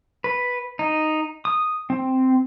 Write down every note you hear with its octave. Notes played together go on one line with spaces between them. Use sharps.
B4
D#4
D#6
C4